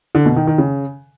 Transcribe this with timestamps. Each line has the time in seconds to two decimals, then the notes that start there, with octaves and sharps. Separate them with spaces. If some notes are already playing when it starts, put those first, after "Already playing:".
0.15 D3
0.26 B2
0.36 D#3
0.47 D#3
0.58 C#3